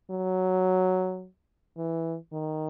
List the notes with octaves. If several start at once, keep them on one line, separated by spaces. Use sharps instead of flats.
F#3
E3
D#3